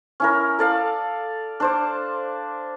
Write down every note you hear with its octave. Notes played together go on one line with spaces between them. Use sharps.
C#4 E4 A#4
A4 D5 F5
D4 C5 D6